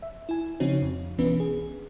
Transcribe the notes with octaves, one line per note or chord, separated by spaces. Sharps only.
E5
E4 G#5
C#3 F3 C4 D#4 F#4 C#5
F2
B1 E3 B3 C#4 D4 B4
G#4